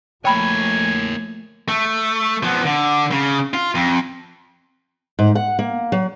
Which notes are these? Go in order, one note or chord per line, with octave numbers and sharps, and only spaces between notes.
F3 A3 A#3 C#5 G5 G#5 B5
A3
F3 B3
D3
C#3
F4
F2
G#2
F#5
A#3
F#3